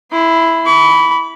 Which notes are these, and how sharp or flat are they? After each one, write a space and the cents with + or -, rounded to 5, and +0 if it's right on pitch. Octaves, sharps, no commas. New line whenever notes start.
E4 +0 C6 -30
B5 +0 D6 -45